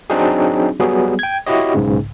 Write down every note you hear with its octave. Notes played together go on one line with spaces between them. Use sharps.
F#3 C4 D4 D#4 F#4 G#4
F#3 G3 B3 F#4 G#4
G5 G#6
E4 F#4 G4 C#5 D#5
B1 G#2 C#3